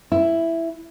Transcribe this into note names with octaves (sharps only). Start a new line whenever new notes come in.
E4